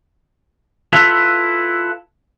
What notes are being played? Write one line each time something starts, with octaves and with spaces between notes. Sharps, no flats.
E4 F4 A4 B4